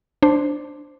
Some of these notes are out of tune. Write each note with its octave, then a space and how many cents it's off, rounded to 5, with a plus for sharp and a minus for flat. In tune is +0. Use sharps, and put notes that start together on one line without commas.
D4 +0 C5 +0